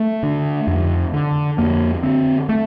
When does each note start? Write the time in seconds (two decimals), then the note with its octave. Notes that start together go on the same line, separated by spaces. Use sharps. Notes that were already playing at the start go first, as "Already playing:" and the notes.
Already playing: A3
0.23 D3
0.67 F2
1.13 D3
1.58 F2 A#3
2.03 D3 C4
2.49 A3